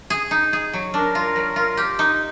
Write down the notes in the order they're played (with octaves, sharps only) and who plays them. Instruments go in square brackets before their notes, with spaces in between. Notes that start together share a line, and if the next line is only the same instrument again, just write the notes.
[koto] G#4
D#4
G#4
F#3
[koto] D4 [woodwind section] A#4
[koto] F4
F#3
F4
G4
D#4